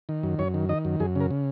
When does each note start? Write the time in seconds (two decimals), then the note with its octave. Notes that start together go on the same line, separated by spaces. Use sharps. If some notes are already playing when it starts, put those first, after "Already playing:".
0.09 D#3
0.23 F#2
0.39 F#2 C#5
0.54 D#3
0.69 D#3 D#5
0.85 F#2
1.00 F#2 G#4
1.16 C#3 A#4
1.31 C#3